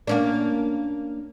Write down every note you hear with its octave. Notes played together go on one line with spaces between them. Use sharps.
A#3 C#4 D4